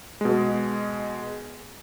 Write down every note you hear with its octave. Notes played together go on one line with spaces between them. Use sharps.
B2 G#3